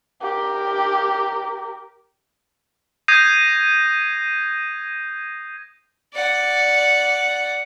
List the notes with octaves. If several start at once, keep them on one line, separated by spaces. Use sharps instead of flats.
G4 A#4
D#6 G6 G#6 A#6 C7 D#7
D5 F#5